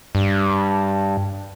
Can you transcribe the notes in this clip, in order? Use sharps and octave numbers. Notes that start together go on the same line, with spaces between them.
G2